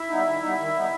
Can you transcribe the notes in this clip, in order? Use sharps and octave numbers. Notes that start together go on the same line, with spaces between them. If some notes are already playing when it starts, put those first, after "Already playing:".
Already playing: E4 E5
G3 B3 D#4
D#3
G3 B3 D#4
D#3
G3 B3 D#4